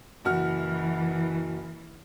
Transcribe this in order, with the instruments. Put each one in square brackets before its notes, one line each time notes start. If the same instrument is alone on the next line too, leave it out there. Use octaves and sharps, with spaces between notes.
[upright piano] F#1 F#4 F6 [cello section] E3